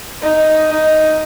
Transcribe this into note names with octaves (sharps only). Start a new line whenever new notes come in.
D#4
D#4